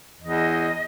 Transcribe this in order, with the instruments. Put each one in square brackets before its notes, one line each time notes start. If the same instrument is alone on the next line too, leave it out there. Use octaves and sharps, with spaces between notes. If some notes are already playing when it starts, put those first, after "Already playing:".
[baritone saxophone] E2 [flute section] D#5